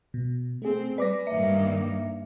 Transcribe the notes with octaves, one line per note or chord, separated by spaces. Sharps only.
B2
A3 C4 G#4
G3 B4 D5 D6 A#6
G2 D#3 A#3 E5